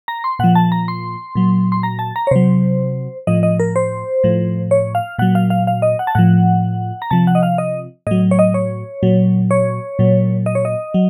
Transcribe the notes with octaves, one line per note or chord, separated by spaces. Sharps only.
A#5
C6
A#2 F3 F#5
A5
A#5
C6
A#2 F#3
C6
A#5
A5
A#5
C#5
C3 F#3 C5
A2 F3 D#5
D#5
A#4
C5
A2 F3
C#5
F5
A#2 F#3 F#5
F5
F5
F5
D#5
F#5
A5
A2 F3 F#5
A#5
C3 F3 A5
F#5
D#5
F5
D#5
A2 F#3 D#5
C#5
D#5
C#5
A#2 F#3
C#5
A#2 F#3
D#5
C#5
D#5
F#3